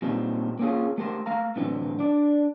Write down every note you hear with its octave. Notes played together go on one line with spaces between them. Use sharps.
A#2 G3 C4 D#4
A#3 C4 C#4 F4 G#4
A3 G4 A#4 C5
A3 F5 A#5
A2 D3 E3 F#3 C4
D4 D5